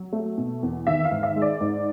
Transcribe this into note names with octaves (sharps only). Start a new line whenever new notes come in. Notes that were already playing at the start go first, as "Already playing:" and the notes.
Already playing: F#3
A3
B2
E2
D#3 E5
F5
G#2
E5
G#3
D5
G#2